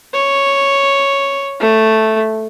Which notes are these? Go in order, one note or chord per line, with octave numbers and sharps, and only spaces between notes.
C#5
A3